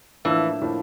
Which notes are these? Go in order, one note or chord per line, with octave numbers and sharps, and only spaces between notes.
A2 E3 F3 A#3 D4
A2 F3 A#3 D4